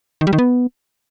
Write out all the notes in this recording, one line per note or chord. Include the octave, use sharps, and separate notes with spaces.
D#3
G3
D#3
B3